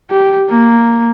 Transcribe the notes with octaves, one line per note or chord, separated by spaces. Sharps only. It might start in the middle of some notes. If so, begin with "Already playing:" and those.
G4
A#3